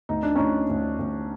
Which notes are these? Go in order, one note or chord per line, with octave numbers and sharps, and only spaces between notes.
D2 D#4
D4
D2 C#4 D#4
D2
D2